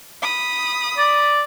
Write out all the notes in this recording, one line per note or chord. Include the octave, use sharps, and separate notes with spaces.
B5 D#6
D5